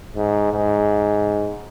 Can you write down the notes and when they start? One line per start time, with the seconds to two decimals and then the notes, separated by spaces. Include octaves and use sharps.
0.16 G#2
0.53 G#2